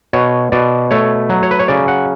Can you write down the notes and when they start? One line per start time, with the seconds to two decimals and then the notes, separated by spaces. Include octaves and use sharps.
0.13 B2 C#5
0.52 B2 D5
0.91 A3 C#5
1.29 F#3
1.43 C#5
1.51 B4
1.59 C#5
1.68 C#3 D5
1.88 F#5